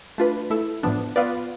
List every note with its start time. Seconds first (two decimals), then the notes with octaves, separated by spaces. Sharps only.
0.18 A3 D4 F4 B4
0.50 A3 E4 A4
0.83 A2 F3 B3 D4
1.16 B3 F4 B4 D5